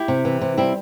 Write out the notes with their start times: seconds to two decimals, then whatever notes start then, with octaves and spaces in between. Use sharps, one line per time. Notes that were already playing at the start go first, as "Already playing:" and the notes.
Already playing: E4 G4
0.08 C3
0.25 E3
0.41 C3
0.58 G3 C4 E4